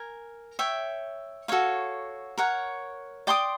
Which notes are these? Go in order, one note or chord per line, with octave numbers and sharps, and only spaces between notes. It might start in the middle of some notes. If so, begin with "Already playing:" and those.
Already playing: A#4 G#5
C#5 E5 G5
F#4 A4 C#5 F5
A#4 C#5 F#5
D5 G5 C6 D#6